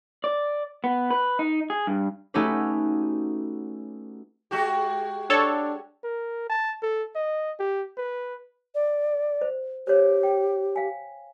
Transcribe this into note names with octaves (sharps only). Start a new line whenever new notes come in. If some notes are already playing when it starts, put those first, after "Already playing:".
D5
B3
B4
D#4
G#4
G2
A3 C#4 D#4 F#4 G4 B4
G#3 F#4 G4
D4 A4 C#5
A#4
A5
A4
D#5
G4
B4
D5
C5
G4 C5 C#5
G5
F5 G#5